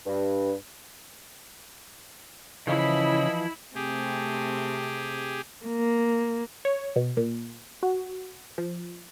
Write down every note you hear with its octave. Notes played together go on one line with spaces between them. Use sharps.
G2
C#3 E3 F3 E4 D#5 B5
C3 A3 C4 G4 G#4
A#3
C#5
B2
A#2
F#4
F3